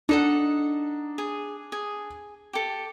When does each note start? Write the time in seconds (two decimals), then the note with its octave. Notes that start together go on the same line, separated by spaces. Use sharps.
0.09 D4 D#4 A4 F#5
1.18 G#4
1.72 G#4
2.53 G4 A4